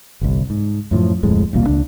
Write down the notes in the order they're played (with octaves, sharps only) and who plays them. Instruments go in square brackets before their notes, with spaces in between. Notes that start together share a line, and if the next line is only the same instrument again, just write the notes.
[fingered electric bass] G1 C2
G#2
F#2 A2 D3 F3
D1 F2 A2 G#3
E1 C2 A#2 A#3
C#2 D4